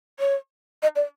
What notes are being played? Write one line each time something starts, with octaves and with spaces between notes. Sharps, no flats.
C#5
D#5
D5